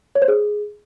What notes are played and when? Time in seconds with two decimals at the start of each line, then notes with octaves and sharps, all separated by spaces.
0.15 C#5
0.22 C5
0.28 G#4